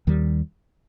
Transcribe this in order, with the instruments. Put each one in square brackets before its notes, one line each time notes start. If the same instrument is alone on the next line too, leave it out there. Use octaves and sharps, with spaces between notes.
[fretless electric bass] D#2 D#3 G3